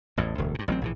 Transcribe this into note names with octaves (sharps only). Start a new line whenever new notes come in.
A1 E2 A2
E1 D2
G2 A#2
A1 F#3 A#3 C4
A#1 A2 E3